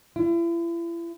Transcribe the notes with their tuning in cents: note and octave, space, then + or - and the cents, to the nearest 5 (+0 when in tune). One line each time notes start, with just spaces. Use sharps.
E4 +40